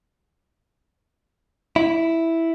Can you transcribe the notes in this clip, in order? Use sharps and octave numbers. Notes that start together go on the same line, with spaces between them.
E4